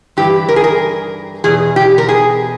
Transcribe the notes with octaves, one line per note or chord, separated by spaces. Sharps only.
G2 E3 G4
A#4
G#4
A#4
E2 B2 G#4
G4
A#4
G#4